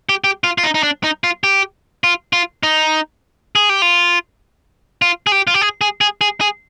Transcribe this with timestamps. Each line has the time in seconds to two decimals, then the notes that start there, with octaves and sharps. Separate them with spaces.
0.09 G4
0.24 G4
0.44 F4
0.58 F4
0.64 D#4
0.74 D#4
0.83 D4
1.04 D#4
1.24 F4
1.44 G4
2.04 F4
2.33 F4
2.63 D#4
3.55 G#4
3.69 G4
3.82 F4
5.02 F4
5.27 G#4
5.32 G4
5.47 F4
5.54 G4
5.62 G#4
5.81 G#4
6.01 G#4
6.21 G#4
6.41 G#4